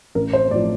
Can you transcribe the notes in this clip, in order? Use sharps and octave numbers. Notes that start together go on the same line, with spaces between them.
A1 A#4
C5
A2 F3 D5